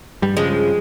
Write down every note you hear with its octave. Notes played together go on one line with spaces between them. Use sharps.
G2 G3
G2 C#3 F3 G#3